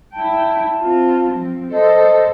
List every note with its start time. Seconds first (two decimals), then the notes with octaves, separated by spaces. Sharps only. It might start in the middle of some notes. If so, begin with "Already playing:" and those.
0.14 E4 G5 A5
0.81 C4 F4
1.30 F3 C4
1.72 A4 C5 D#5